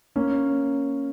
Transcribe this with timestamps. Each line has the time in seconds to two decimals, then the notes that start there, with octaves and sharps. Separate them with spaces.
0.16 A#3 C#4